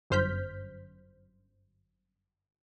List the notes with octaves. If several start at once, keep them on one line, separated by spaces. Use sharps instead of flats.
G1 F#2 C5 F6 G6 B6